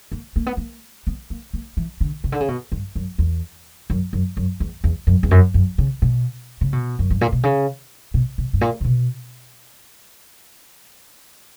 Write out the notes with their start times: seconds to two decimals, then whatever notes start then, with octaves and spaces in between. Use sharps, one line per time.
0.12 A#3
0.36 A#3
0.46 B3
0.57 A#3
1.07 B3
1.30 A#3
1.54 A#3
1.77 E3
2.01 D3
2.24 C#3
2.32 D3
2.40 C#3
2.48 B2
2.72 G2
2.96 F#2
3.19 E2
3.90 F#2
4.13 F#2
4.37 F#2
4.60 E2
4.84 E2
5.07 F#2
5.23 E2
5.31 F#2
5.54 F#2
5.78 C#3
6.02 B2
6.61 C#3
6.73 B2
6.99 F#2
7.10 G2
7.21 A#2
7.32 B2
7.43 C#3
8.14 B2
8.38 B2
8.53 G2
8.61 A#2
8.81 C#3
8.84 B2